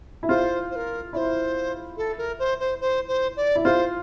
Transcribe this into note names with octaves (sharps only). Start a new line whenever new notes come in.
E4
F4 C5
C5
A#4
E4 C5 D5
A4
A#4
C5
C5
C5
C5
D5
E4
F4 C5